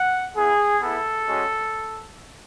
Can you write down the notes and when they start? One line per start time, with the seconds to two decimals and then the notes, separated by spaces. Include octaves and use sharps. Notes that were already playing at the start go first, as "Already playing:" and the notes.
Already playing: F#5
0.36 B3 E4 G#4
0.82 B3 E4 A4
1.28 G#3 C#4 F#4